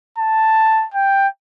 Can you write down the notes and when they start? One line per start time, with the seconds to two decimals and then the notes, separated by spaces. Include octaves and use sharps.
0.18 A5
0.94 G5